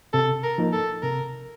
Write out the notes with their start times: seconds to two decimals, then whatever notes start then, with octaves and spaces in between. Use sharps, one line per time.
0.13 C3 A4
0.43 A#4
0.58 F3 A#3 D#4 A#4
0.73 A4
1.02 C3 A#4